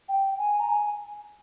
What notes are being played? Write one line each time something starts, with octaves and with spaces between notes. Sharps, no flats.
G5
G#5
A#5
G#5